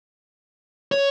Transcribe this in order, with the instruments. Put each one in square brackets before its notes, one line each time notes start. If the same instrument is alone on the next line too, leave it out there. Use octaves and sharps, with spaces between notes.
[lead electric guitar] C#5